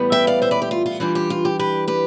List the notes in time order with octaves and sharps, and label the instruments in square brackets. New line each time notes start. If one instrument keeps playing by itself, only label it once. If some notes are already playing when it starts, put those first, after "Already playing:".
Already playing: [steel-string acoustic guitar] A2 E3 G3 B3
E5 G5
D5 F5
C5 E5
B4 D5
G4
F4
F4
E3 G3 D4 F4 G4
G4
F4
G4
G4 B4
G4 B4